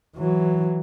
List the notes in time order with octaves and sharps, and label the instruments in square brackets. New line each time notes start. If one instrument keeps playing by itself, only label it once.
[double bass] E3 F#3